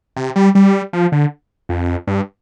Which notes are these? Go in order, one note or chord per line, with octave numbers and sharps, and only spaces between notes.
C3
G3
G3
F3
D3
F2
G2